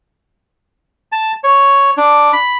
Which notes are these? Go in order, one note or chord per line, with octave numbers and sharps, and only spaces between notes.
A5
C#5
D4
B5